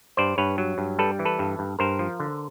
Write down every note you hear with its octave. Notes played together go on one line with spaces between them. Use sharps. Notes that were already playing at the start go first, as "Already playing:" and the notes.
G2 C5 D5
G2 B4 C#5
F#3
G2
G3 A4 B4
E3
A4 B4
G2
G2
G2 A#4 C5
F3
D3